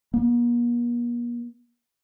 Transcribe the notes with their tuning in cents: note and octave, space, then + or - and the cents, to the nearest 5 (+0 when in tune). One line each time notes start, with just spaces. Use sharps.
A#3 +45